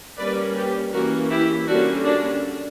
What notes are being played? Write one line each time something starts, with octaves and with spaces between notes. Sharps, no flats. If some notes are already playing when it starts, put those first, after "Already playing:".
G3 A#3 C#4 B4 D5
G4 B4
E3 A#3 C#4 F#4 A#4
E4 G4
D3 G3 A#3 C#4 D4 F#4
D4 F#4